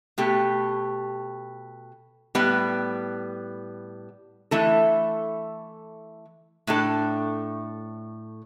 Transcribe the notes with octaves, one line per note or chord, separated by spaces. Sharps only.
B2 A3 G4
A2 G3 B3
E3 A3 E4 A4
A2 A3 D4 A4